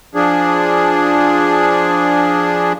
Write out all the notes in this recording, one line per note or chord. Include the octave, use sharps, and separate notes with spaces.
F3 D4 G#4